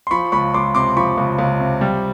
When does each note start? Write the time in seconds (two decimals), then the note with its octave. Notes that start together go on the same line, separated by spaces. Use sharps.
0.07 C6
0.11 F3 B5 C#6
0.32 C#2 B5 C#6
0.54 C#2 C6 D6
0.75 C3 C6 D6
0.96 F3 B5 C#6
1.18 C#2
1.38 C#2
1.60 C3
1.81 G3